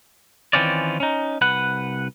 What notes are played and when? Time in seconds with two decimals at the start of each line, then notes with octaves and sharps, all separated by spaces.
0.53 D#3 E3 C4 C#4 F4 D5
1.00 C#4 D#4
1.41 C2 B4 F#5